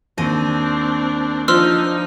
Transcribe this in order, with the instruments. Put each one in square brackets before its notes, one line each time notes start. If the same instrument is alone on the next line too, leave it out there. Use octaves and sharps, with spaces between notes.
[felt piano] D#2 [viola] C4 D4 [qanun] D#5
[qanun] F3 D4 [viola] D#4 [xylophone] C6 E6 F6